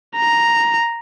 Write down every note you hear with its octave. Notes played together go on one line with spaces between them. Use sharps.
A#5